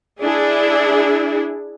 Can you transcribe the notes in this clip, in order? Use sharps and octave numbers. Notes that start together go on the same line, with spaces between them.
D4 E4 G#4